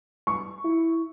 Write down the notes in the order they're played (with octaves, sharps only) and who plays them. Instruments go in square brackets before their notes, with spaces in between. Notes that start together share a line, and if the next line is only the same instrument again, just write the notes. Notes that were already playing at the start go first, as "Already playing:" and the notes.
[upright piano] C#6
[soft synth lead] E4